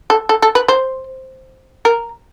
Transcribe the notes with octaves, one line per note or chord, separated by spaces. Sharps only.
A4
A4
A4
B4
C5
A#4